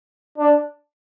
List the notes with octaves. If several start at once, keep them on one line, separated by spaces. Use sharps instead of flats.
D4